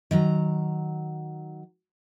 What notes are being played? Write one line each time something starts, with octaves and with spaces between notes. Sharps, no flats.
D#3 F#3 A#5